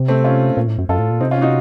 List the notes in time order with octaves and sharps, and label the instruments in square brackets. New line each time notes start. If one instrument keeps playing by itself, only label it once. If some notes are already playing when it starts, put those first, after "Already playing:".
Already playing: [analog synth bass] C3
[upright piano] A3 C4
C#4 F4
[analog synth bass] A#2
A2
F#2
[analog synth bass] F#2 [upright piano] F4 A4
[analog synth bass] A2
A#2
[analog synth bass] C3 [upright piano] C4 D#4
[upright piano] C#4 F4
D#4 F#4